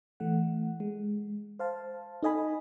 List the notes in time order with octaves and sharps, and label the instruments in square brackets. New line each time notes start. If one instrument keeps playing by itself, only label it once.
[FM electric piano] E3 A3 F#5
G#3
C5 F5 A5
D#4 A4 D#5 G#5 B5